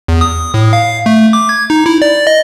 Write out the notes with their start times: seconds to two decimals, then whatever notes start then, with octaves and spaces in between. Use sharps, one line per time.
0.08 E2
0.21 D#6
0.54 A2
0.73 F5
1.06 A3
1.33 D6
1.49 G#6
1.70 D#4
1.86 E4
2.02 D5
2.27 D#5